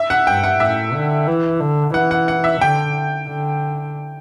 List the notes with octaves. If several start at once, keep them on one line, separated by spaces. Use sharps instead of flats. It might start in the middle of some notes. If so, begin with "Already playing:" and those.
Already playing: E5
F#5
G2 G5
F#5
A2 E5
D3
E3
D3
E3 F#5
F#5
F#5
E5
D3 G5
D3